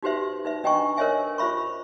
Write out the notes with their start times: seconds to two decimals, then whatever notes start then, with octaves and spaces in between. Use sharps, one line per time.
0.03 D#4 F#4 G4 B4 C5 E5
0.45 D#4 B4 E5
0.64 D4 D#5 G5 G#5 A#5 C#6
0.97 A#4 C5 C#5 D#5 E5 G#5
1.38 F4 C5 E5 B5 C#6